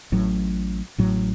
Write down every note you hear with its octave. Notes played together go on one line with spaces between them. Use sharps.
A1 A2 F#3
A1 A2 F#3